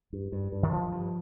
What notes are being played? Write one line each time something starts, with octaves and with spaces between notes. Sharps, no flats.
G2
G2
G2
D#3
G2 F3
G2